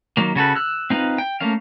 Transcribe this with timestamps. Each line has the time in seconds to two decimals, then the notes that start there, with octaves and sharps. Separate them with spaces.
0.17 D#3 F#3 A#3
0.36 C#3 F#4 A4 B4
0.55 E6 F#6
0.90 C4 D#4 F4 B4
1.18 G5
1.40 A3 A#3 C#4 F5